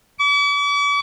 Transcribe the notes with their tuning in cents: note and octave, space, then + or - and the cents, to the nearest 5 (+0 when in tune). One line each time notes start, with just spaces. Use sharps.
D6 -45